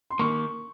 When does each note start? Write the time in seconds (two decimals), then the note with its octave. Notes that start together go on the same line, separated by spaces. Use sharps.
0.10 C6
0.19 D#3 A#3 C#6